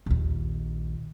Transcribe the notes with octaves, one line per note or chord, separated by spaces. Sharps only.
A#1 D#2